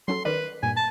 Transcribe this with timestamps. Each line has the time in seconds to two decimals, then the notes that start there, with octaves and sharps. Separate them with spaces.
0.08 F#3 C#4 A4 C6
0.25 D#3 A#4 B4 D5
0.63 G2 A#2 G#5
0.77 A5